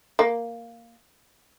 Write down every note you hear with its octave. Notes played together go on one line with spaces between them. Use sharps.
A#3